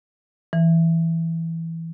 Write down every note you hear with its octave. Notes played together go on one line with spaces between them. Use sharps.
E3